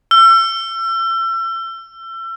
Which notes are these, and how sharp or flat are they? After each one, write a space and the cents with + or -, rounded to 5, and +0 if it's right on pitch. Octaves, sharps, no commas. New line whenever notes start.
E6 +35